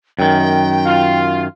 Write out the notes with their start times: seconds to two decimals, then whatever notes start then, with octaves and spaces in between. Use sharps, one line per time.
0.19 F#2 D#3 G5
0.85 F4